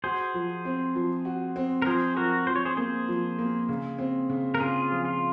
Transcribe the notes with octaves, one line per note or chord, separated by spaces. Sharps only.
F#4 G#4 C5
F3
C4
F3
F#4
C4
A#4
F3 G#4 C5
F3 F#4 A#4
F3 C5
C#5
G#4 C5
A#3 G#4 C5
F3
A#3
C#3
C4
C#3
A#4
C#3 F4 G#4
F3
F4